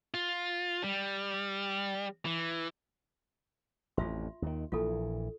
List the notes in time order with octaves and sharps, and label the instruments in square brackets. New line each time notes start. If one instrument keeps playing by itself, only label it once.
[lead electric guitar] F4
G3
E3
[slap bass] A1 F2 [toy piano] F4 E5 C6
[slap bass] D#2 D#3
[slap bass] A#1 A#2 E3 [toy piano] F4 A4